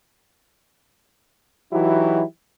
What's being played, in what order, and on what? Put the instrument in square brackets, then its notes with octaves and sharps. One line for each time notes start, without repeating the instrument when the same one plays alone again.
[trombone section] E3 F#3 D#4 E4 F#4 G4